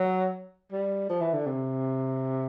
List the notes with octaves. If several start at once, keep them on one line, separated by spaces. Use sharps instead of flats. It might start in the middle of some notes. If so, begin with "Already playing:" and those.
Already playing: F#3
G3
F3
E3
D3
C3